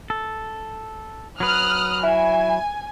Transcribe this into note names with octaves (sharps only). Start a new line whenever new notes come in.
A4
F#3 B4 D#6 F6 F#6
E4 G#5